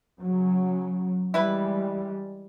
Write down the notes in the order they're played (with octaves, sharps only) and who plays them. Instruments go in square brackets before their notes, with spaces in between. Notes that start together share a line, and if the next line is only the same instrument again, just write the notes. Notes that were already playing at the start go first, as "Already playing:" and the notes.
[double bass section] C#3 F#3
[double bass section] E3 G3 G#3 [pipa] E4 B4